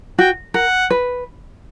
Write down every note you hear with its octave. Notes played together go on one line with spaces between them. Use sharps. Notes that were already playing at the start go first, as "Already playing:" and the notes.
F#4 G5
A#4 F#5
B4